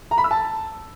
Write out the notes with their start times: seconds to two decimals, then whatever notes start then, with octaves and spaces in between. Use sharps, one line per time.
0.11 A#5
0.18 B5
0.24 E6
0.31 A5